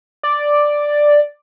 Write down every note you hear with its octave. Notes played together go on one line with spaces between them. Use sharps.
D5